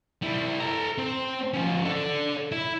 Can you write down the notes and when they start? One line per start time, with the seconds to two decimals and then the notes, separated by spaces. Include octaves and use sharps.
0.22 G3 E4
0.60 A4 A#5
0.98 C4
1.54 F3 C#4
1.85 A4 D5
2.52 E4